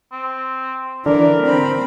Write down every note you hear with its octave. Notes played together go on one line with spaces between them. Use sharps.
C4
D3 E3 A#4 D5
C4 B5